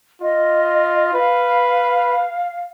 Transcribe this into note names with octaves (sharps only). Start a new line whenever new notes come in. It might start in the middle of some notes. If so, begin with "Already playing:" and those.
F4 D#5
B4 F5